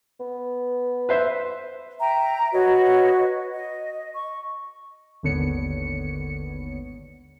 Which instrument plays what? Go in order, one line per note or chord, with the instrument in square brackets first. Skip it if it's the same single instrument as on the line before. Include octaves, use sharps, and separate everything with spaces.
[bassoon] B3
[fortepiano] B4 C5 E5
[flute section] E5 G5 A#5
F#4 B4 C#5 D#5
D#5
C#6
[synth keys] G#1 D#2 D3 B3 C#5 C#7